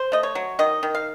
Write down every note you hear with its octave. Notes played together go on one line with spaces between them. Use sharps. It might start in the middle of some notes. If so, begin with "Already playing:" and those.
Already playing: C5
A3 D#5
C#5
F#3
D#3 D#5
D#3
F5